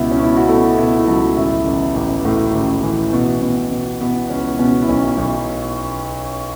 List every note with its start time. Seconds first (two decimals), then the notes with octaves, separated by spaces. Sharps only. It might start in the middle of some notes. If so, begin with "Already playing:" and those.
Already playing: C#2 B2 E4 E5
0.11 C#4
0.20 B2 E4
0.36 F#4
0.48 B2 A3 A4
0.78 B2 E4
0.98 E4
1.07 C#2 F#3 F#4
1.37 A1 E4 E5
1.67 A1
1.96 A1
2.25 A2
2.54 A1
2.83 E3
3.13 B2
3.42 B2
3.71 B2
4.01 B2 B3 B4
4.30 C#2 C#4
4.59 B2 C#4
4.82 E4
4.89 B1 C#4
5.18 B1